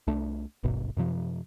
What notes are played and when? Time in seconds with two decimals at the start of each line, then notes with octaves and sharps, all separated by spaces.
0.07 C2 A3 D4
0.63 D1 G#1 G2 B2
0.97 F#2 C3 F3